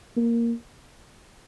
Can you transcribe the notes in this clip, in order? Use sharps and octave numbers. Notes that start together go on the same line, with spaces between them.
A#3